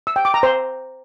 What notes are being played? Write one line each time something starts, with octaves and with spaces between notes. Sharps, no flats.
E6
G5
D6
A#5
C5